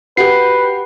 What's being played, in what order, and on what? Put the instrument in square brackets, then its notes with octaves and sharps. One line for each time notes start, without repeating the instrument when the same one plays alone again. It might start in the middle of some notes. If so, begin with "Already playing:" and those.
[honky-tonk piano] F#4 G4 [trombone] B4 [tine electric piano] C7